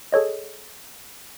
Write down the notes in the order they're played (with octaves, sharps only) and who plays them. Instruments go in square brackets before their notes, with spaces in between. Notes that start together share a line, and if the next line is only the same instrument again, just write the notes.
[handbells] G#4 A4 C#5 D#5